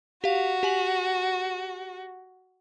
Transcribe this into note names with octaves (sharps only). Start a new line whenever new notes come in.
F#4 G4 F5
G4 G#5 F#7